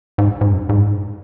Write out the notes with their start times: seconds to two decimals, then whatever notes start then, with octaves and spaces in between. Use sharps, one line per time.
0.18 G#2
0.41 G#2
0.52 F#2
0.69 G#2